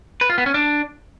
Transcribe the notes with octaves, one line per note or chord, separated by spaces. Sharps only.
B4
F4
B3
C#4
D4